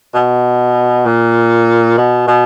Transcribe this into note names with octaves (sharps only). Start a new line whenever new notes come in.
B2
A#2
B2
B2